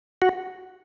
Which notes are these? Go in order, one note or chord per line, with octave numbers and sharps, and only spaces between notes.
F#4